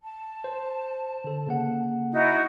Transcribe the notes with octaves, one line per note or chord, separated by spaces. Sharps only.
A5
C5
D3 A4
C#3 A#3 F#5
D#4 E4 F#4